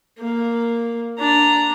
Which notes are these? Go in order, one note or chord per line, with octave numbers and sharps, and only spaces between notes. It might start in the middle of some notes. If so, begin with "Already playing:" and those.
A#3
D4 A#5